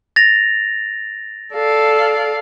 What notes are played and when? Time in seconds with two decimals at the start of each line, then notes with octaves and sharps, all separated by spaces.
0.16 A6 A#6 F7
1.56 A4 D5 F5